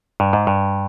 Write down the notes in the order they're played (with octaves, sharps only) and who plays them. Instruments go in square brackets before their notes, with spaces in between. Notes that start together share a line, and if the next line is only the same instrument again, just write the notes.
[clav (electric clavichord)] G2
G#2
G2